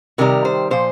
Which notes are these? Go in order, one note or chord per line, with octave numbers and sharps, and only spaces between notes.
C3 D#3 G3 A#4
C5
A#2 F3 C5